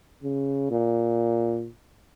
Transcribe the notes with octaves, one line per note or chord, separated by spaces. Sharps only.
C#3
A#2